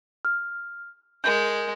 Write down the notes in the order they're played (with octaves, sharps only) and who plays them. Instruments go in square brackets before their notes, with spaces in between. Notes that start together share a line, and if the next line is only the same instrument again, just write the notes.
[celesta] F6
[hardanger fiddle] G#3 [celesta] A#4 G6